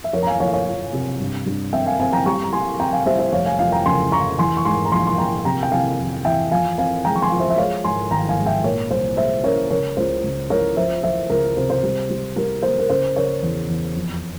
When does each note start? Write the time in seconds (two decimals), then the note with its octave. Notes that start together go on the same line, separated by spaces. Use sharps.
0.04 E5
0.13 F2 A#4 C#5
0.23 A#5
0.27 F5 G#5
0.40 F3 C#5 F5
0.53 C#5 F5
0.67 F3
0.93 C3
1.20 G2
1.46 G2
1.73 C4 E5 G5
1.86 F5 G#5
1.99 C4 F5 G#5
2.13 G5 A#5
2.26 G3 A#5 C#6
2.44 A#5
2.53 G3 G#5 C6
2.79 C4 G5 A#5
2.93 F5 G#5
3.06 G3 C5 E5
3.19 C5 E5
3.32 F1 C#5 F5
3.46 F5 G#5
3.59 F2 F5 G#5
3.72 G5 A#5
3.86 C#3 G#5 C6
4.12 F1 A#5 C#6
4.38 E3 G#5 C6
4.57 C#6
4.65 G#2 G#5 C6
4.85 A#5
4.92 A#1 G#5 C6
5.07 C6
5.18 A#1 G5 A#5
5.45 C3 G5 A#5
5.63 G5
5.72 C3 F5 G#5
5.99 F2
6.25 E3 E5 G5
6.51 F3 F5 G#5
6.78 C4 F5 G#5
7.05 G#3 G5 A#5
7.16 C#6
7.22 G#5 C6
7.31 F3
7.40 C5 E5
7.50 E5
7.58 G#3 C#5 F5
7.84 G#2 G#5 C6
8.11 G#1 G5 A#5
8.29 F5 G#5
8.38 G#2
8.46 E5 G5
8.64 A#2 A#4 C#5
8.90 C2 C5
9.17 G#3 C5 E5
9.44 C#4 A#4 C#5
9.70 C#3 A#4 C#5
9.97 C#2 C5
10.23 C#2
10.50 C#2 A#4 C#5
10.77 F3 C5 E5
11.03 F3 C5 E5
11.30 C#2 A#4
11.57 C3 C5
11.70 C5
11.83 G3
12.10 G3
12.36 G3 A#4
12.63 A#3 C5
12.79 A#4
12.90 C#3 C5
13.16 C#3 A#4 C#5
13.42 E2
13.69 E2
13.96 F2